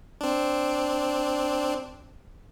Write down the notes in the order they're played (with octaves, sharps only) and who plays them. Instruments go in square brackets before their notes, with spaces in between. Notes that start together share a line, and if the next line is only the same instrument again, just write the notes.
[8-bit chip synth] C4 D4